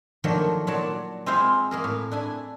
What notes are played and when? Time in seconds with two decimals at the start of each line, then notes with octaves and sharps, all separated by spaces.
0.24 D#3 F3 F#3 A3 A#3 D4
0.67 A#2 F#3 C#5 D5 A5
1.26 G#3 C4 E4 F4 C5 F5
1.71 A#3 G#4 A#4
1.84 A2
2.12 D4 E4 G#5